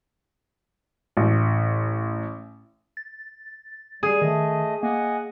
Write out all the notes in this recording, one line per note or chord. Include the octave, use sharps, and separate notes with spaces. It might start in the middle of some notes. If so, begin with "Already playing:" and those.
A1
A6
G3 G#4
D#3 A3 D#5
A#3 D#5 F#5 G#5